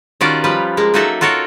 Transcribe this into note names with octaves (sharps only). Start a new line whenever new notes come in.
D#3 G3 C#4 F4 F#4 D5
F3 G3 B4
G#3 A#3
F#3 A#3 D#4 F#4 A4 E5
F4 F#4 A4 A#4 C#5